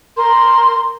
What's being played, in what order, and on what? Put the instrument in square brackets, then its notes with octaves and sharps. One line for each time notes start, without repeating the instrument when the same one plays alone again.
[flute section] A#4 C6